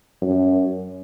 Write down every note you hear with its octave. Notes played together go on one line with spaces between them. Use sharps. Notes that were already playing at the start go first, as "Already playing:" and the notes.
F#2